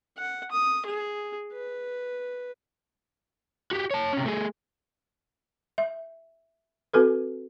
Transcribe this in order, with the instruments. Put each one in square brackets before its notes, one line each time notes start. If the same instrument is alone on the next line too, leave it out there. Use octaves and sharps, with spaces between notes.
[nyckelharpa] F#5
D#6
G#4
B4
[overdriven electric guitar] F#4 G4
C#5 A5
C3 C#4
A3 G#4
[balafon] E5
C4 F#4 A4 B4